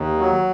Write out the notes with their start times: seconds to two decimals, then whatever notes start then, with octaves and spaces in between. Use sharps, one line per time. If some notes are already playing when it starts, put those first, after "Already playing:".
Already playing: D#2
0.18 F#3